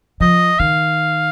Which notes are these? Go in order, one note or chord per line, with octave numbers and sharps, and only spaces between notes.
F3 D#5
D#3 F5